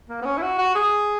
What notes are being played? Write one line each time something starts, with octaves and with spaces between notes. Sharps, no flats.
A#3
B3
C#4
E4
F#4
F#4
G#4